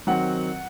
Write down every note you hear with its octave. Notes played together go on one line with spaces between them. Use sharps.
D#3 F#3 C4 F#5